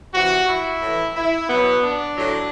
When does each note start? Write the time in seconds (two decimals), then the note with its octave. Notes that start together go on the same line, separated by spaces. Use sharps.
0.14 C3 E3 F#4
0.48 E4
0.82 A2 E3
1.15 E4
1.48 B2 F#3 B3
1.82 D4
2.16 A2 F#3